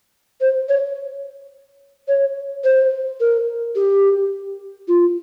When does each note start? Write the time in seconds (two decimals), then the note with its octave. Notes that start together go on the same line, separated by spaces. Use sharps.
0.41 C5
0.69 C#5
2.08 C#5
2.64 C5
3.20 A#4
3.76 G4
4.88 F4